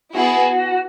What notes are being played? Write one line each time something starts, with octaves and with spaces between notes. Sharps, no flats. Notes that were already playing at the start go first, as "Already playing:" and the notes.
B3 E4 F#4 G#4